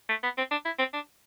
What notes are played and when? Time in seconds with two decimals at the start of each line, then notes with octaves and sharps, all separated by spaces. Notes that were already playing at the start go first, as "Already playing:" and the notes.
0.09 A3
0.23 B3
0.38 C4
0.51 D4
0.65 E4
0.79 C4
0.93 D4